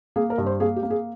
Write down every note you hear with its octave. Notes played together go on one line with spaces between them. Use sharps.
A#3 G#4
A#4
G2
C5
A#3 G#4
G4
A#3
G#4